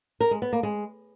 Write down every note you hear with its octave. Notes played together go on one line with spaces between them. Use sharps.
A#4
G#3
B3
A#3
G#3